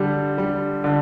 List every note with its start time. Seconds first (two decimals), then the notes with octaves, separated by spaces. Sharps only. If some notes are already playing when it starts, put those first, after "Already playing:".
Already playing: D3 G3
0.38 G3
0.84 D3